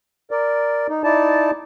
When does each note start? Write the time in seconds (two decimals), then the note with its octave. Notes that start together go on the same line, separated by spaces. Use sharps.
0.31 A#4 D5
0.90 D#4
1.04 D#4 E4 D5 A5